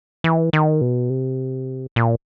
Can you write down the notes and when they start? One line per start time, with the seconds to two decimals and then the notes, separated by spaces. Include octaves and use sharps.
0.24 E3
0.53 D#3
0.81 B2
1.10 C3
1.96 A#2